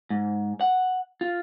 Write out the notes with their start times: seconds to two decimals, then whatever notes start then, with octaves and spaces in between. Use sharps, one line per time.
0.10 G#2
0.61 F#5
1.21 F4